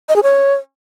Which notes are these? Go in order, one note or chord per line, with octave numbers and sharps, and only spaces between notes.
D#5
G#4
C#5